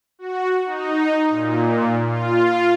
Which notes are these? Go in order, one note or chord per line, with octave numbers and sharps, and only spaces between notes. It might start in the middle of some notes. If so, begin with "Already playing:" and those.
F#4
D#4
A#2
F4